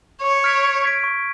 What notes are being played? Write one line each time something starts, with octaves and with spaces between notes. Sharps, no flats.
C#5 C#6
F6 G#6 B6 D7
C#6
F6 G#6 B6 D7
C#6